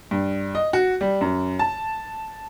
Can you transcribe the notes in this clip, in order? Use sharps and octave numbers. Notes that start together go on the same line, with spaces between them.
G2
D#5
F#4
G3
F#2
A5